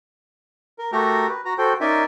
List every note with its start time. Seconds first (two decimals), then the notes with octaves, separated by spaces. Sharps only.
0.78 A#4
0.92 A3 F#4 G4 A4 A#4 A#5
1.28 B4
1.45 F#4 A#5
1.58 F#4 A4 C5 G5
1.81 C#4 D#4 A#4 D5 E5 G#5